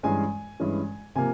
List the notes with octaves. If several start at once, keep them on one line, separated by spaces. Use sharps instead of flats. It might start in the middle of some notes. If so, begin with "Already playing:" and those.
G2 E3 G#3 C#4 G#5
G2 E3 G#3 C#4
C3 F3 A#3 G#5